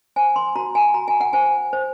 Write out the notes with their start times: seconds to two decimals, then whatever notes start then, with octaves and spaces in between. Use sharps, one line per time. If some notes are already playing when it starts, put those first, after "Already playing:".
0.16 C5 G#5
0.36 C6
0.56 F#4 A#5
0.75 G#5
0.94 F#4 A#5
1.08 G#5
1.20 F#5
1.33 C5 G#5
1.73 C5